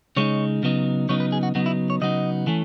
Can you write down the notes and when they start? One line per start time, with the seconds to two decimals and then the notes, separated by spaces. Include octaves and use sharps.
0.16 C#3 G#3 D#4 C#5
0.63 C#3 F#3 B3 D#4
1.09 C#3 F#3 B3 D#4 C#5
1.20 B4
1.32 G#4
1.43 F#4
1.55 C#3 F#3 B3 D#4 F#4
1.66 E4
1.90 C#5
2.01 C#3 F#3 B3 D#4 D#5
2.47 E3 A3 C#4